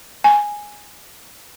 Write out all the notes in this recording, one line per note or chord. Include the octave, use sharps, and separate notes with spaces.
G#5